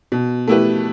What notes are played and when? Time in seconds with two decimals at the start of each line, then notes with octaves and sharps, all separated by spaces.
0.12 B2
0.48 A3 E4 G4 B4